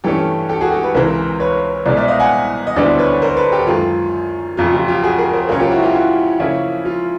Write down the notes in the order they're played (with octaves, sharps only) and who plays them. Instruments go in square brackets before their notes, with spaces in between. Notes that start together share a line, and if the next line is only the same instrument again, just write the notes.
[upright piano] G2 E3 A3 C#4 [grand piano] G4 A4
[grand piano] G4 A4
F#4 G#4
G4 A4
A4 B4
[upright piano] C#2 C3 E3 G#3 C4 [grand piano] A#4 C5
[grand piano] B4 C#5
[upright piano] C2 B2 G#3 [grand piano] C5 D5
[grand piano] D5 E5
D#5 F5
F#5 G#5
D#5
[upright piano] D2 D3 G3 B3 E4 [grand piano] C5 D5
[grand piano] B4 C#5
A#4 C5
A4 B4
G4 A4
[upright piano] F#2 D#3 G#3 [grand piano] F4
[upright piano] F2 C#3 F#3 A3 [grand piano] F4
[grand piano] F4 G4
F4 G4
F#4 G#4
G#4 A#4
A#4 C5
[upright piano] C#3 F#3 A#3 C#4 [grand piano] A#4 C5
[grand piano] F4 G4
E4 F#4
F4 G4
E4 F#4
[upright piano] C#3 F3 A#3 C#4 E4
[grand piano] F4